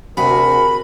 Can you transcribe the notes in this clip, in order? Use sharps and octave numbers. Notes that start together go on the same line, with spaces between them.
D2 C3 F#4 G#4 A#4 B5